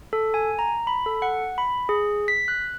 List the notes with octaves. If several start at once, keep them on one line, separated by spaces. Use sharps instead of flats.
A4
G#5
A#5
B5
A4
F#5
B5
G#4
B6
F#6